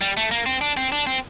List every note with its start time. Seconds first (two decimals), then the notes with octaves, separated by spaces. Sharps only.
0.01 G3
0.17 A3
0.31 A#3
0.46 C4
0.61 D4
0.77 C4
0.92 D4
1.07 C4